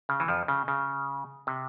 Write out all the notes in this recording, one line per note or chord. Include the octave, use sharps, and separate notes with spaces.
C#3
E3
F2 F3
C#3
C#3
C3